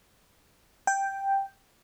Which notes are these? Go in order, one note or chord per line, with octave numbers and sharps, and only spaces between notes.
G5